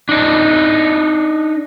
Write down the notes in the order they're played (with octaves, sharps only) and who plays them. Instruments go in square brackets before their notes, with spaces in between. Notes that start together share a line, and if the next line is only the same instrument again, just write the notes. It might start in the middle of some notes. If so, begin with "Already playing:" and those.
[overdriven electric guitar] D4 D#4